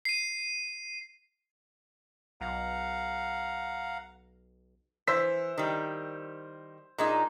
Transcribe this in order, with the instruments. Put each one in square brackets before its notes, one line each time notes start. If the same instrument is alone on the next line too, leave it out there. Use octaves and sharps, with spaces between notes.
[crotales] C7 D#7
[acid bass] B1 [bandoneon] F5 F#5 A#5
[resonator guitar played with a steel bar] E3 [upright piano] C5 E6 B6
[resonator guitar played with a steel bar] D#3 G3
A#2 G#3 D#4